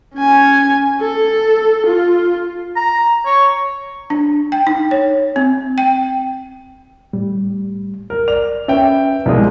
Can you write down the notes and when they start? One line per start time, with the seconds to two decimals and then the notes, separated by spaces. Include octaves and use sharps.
0.15 C#4 G#5
1.01 A4
1.86 F4
2.76 A#5
3.26 C#5
4.10 D4
4.52 G5
4.67 D#4
4.91 C#5
5.36 C4
5.78 G5
7.13 A2 G3
8.10 A#4
8.28 D5 F7
8.68 C#4 B4 E5 G5
9.26 C2 B2 F3 G#3 A#4 D#6